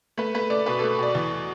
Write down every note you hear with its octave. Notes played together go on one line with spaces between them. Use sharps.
A3 B4
A3 B4
A3 D5
B2 B4
A4
A3
B2 D5
E2